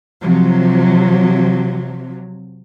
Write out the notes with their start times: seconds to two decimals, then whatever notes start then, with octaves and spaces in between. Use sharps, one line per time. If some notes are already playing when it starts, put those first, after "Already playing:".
0.23 C3 F3 F#3